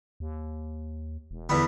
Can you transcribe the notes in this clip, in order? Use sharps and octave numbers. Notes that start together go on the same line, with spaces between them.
D#2
E1
E2 D3 B3